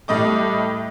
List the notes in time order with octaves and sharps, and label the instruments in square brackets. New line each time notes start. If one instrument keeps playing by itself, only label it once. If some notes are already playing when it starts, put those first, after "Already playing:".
[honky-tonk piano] A2 G3 D#5 D6